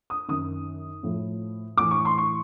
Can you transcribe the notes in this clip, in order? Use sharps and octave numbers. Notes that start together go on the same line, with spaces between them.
D#6
F#2 D#3 D#6
A2 F3
A2 E3 D6
C#6
C6
C#6